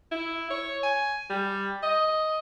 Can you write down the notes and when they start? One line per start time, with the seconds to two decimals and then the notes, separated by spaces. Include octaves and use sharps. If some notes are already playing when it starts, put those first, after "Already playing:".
0.11 E4
0.50 C#5
0.83 G#5
1.30 G3
1.83 D#5